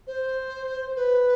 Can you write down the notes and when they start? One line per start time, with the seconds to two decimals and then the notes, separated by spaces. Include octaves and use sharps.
0.07 C5
0.96 B4